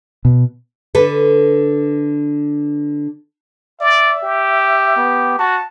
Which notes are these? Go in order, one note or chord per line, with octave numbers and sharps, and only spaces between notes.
B2
D3 A4 B4
D5 E5
G4
B3
F#4 A5